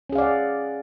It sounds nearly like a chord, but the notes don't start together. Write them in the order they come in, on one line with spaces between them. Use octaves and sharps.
C#4 G#4 F5 D5 F#5